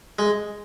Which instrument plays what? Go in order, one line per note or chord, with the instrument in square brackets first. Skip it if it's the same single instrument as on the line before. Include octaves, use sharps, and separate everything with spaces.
[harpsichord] G#3